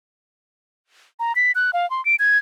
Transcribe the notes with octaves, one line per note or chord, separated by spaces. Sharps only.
A#5
B6
F#6
F5
C6
D7
G#6